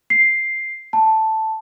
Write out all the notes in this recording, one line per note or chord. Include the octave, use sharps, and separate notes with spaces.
C7
A5